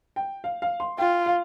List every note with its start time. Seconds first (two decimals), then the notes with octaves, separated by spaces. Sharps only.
0.16 G5
0.44 F5
0.62 F5
0.80 C6
0.98 F4 G5
1.26 F5